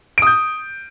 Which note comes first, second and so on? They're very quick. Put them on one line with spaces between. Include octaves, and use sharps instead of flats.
D7 D#6 G6